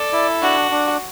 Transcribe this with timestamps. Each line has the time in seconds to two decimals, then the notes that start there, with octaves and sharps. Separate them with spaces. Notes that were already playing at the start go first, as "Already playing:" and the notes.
Already playing: A4 D5
0.12 E4
0.42 D4 F#4
0.71 D4